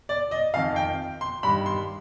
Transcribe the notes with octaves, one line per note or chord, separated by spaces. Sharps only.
D5
D#5
F2 D#3 F5
G5
C6
G2 D#3 B5
C6